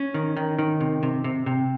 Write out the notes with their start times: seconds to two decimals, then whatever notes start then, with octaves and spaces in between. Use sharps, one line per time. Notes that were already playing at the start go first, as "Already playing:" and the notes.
Already playing: C#4
0.14 D#3
0.37 D#3
0.59 D#3
0.81 C3
1.03 C3
1.24 C3
1.46 C3